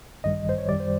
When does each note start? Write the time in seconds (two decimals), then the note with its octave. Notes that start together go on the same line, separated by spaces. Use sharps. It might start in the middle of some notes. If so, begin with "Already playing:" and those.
0.24 A1 G2 D#3 G3 D#5
0.49 C5
0.58 C#5
0.69 F#2 D#3 G3 D5
0.80 C5